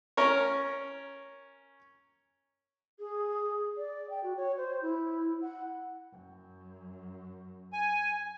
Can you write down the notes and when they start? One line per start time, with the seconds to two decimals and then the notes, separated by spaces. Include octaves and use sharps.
0.17 C#4 A#4 C#5
3.00 G#4
3.77 D5
4.10 G5
4.23 F#4
4.37 C#5
4.57 C5
4.82 E4
5.42 F#5
6.12 F#2
7.73 G#5